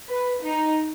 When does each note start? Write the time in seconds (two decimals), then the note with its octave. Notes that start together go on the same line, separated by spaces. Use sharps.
0.09 B4
0.44 D#4